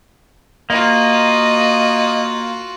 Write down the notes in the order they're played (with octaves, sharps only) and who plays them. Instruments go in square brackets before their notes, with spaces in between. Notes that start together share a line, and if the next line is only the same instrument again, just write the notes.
[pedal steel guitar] A#3 [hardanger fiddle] F4 F#4 [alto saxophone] D#5